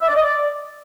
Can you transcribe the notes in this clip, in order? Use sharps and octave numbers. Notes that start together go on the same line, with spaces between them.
E5
D5
D#5
D5